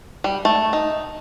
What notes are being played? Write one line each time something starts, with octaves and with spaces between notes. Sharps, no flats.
G3
A3
D#4